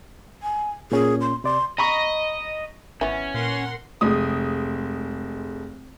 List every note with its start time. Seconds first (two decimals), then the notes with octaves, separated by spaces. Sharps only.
0.43 G#5
0.92 A#2 C#4 G#4
1.21 C6
1.44 C3 D5 C6
1.78 D#5 A#5 B5 C#6
3.01 G#1 E3 B3 C#4
3.34 A#2 A#4 F#5 C6
4.01 F1 G#3 D#6